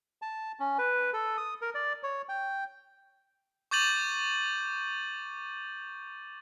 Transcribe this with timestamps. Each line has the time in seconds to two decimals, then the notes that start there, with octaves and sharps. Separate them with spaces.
0.22 A5
0.60 C#4
0.78 B4
1.13 A4
1.37 D#6
1.62 A#4
1.75 D5
2.03 C#5
2.29 G5
3.71 C#6 D6 G6 A6 D#7 F#7